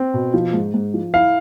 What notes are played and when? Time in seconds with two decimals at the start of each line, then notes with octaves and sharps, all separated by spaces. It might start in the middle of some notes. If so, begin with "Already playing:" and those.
Already playing: C4
0.14 B2
0.34 F3
0.53 G#2
0.74 G#2
0.94 F3
1.14 E4 F5